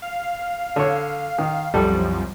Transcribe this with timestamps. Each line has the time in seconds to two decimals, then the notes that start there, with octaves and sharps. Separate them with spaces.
0.02 F5
0.76 D3 C#5
1.38 D#3
1.74 C2 F#2 F3 G3 A4